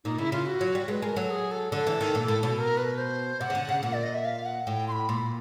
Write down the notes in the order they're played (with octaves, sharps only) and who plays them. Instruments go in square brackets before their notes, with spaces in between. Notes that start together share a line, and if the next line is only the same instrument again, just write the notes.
[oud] A#2 [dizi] D#4
[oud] C#3 [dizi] E4
[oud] C#3 [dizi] F4
[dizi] F#4
[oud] F#3
G3
[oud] G#3 [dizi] B4
[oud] G#3 [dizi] A#4
[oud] F#3 [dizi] A4
[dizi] G#4
A4
[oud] D3 [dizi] A4
[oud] E3
D#3
A#2
A2
B2
[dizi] A#4
B4
C5
[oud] C3 [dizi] F#5
[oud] C#3
D3
C#3
A#2
[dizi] D5
D#5
E5
F5
F#5
[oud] A2 [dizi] G5
[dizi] C6
B5
[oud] A#2 [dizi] C6
[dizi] B5